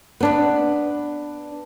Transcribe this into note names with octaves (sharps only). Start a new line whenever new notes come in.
B3 D4 B4